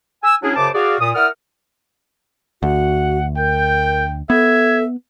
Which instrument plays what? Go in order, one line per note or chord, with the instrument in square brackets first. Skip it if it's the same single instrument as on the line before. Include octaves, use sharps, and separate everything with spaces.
[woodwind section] G#5 E6
F#3 C#4 D4 E4 G#4
F#2 C#3 C5 A5 D6
F#4 G#4 D5 F5
A#2 D#6
E4 A#4 D5 F#5 D#6 F6
[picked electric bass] D2 [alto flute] F#4 [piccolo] F#5
[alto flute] A#4 [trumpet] G5 [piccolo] G6
[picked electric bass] B3 [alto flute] A4 [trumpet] E5 [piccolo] G#6